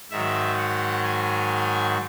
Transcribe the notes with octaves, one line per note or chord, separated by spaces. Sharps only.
G#2 D#3 F#3 E5
F#5
G#5